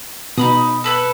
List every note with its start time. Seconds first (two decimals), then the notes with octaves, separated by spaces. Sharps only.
0.38 B2 D#4 B5 D#6
0.84 A4 B4 G#5